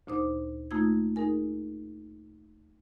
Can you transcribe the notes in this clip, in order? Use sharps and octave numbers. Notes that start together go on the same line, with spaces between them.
D2 A#2 D#4 C5 D6
A3 A#3 D#4 F4 E6 G#6
D#4 G#4 A#4 G#5